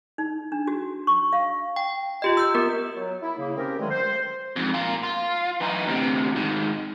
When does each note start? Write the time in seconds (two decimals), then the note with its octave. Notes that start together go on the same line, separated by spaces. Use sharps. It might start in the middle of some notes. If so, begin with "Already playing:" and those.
0.18 D#4
0.52 D4
0.67 F#4
1.07 C#6
1.33 F5
1.76 G5
2.22 F4 G4 D#5
2.37 E6 G6
2.55 B3 A#4
2.97 F#3
3.23 E4
3.37 C#3 A#3
3.57 C4 C#4 G4 A#4
3.79 G2 D3 D#3 F#3 G#3 A3
3.90 C5
4.56 F2 G#2
4.74 A#3 F4
5.03 F4
5.60 E3 D#4
5.86 D2 C3
6.36 G#2 D#3